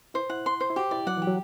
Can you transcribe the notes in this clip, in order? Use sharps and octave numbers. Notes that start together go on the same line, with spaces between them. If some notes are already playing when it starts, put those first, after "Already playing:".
E4 C5
E4 F#5
C6
C5
E4
F#4 G4
E4 D5
F#3 F#5
E3
G4
F#3